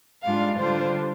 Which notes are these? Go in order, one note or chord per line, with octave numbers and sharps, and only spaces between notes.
G#2 G3 D4 F4 F5
D3 G3 D4 F4 C5